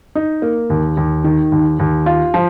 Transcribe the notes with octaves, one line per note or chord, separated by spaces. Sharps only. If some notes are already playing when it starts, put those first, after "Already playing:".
D#4
A#3
D#2
D#2
D#3
D#2
D#2
F4
F3